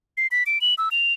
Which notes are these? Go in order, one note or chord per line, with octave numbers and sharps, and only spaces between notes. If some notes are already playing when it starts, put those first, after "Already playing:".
C7
B6
D7
F#7
E6
F7